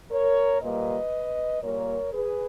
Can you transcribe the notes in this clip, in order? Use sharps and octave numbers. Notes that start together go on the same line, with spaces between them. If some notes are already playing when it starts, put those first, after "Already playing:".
A#4 C#5
A#2 G3 A#3 B4 D#5
A#2 G3 A#3 A#4 C#5
G#4 B4